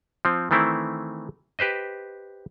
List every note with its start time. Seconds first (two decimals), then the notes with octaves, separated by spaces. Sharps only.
0.25 F3 C4
0.51 D#3 E3 A3 C4 E4
1.59 G4 B4 C5 D#5